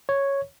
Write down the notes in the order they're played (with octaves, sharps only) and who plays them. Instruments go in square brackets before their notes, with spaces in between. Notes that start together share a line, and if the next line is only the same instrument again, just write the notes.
[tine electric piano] C#5